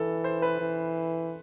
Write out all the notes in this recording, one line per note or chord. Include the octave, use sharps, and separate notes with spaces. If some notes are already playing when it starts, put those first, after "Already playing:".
Already playing: E3 A4
C5
B4
E3